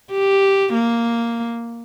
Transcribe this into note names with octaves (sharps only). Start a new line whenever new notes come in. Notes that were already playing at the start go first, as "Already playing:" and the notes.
G4
A#3